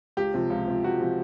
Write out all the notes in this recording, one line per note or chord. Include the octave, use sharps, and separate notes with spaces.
C#2 G4
C3 F3
C#2
C3 F3
C#2 F#4
C3 F3